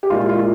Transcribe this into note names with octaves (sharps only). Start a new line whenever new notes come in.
G4
A#2 G#3 E4 F4
F4